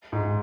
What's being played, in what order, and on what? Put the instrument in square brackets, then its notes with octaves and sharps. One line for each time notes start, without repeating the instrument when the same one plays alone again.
[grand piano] G#2